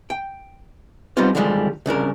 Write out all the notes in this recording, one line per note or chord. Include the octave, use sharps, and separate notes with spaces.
G5
G3 B3 C4 D#4 F4 C5
D3 D#3 F3 G3 G#3
C2 C#3 D4 A#4